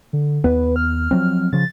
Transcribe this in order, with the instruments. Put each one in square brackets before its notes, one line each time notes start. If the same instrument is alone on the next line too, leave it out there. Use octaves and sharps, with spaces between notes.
[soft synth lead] D3
[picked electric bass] D#2 B3 [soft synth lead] B4
[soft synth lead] F6
[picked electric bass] F3 F#3 C4
[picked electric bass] C#3 F3 [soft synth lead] A6